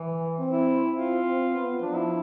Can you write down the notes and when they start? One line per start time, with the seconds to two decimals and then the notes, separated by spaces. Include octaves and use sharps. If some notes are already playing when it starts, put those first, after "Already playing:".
Already playing: E3
0.38 C4
0.52 E4
0.95 C4 F4
1.24 C4
1.53 B3
1.81 F3 D4
1.95 E4